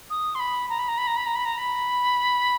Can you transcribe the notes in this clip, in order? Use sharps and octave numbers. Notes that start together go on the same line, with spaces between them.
D#6
C6
B5
A#5
B5
A#5
B5
A#5
B5
A#5
B5
A#5
B5